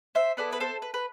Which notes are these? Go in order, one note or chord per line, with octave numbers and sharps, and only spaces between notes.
C5 E5
B3 E4 A4 B4 D5
B4
A4 C5
B4
B4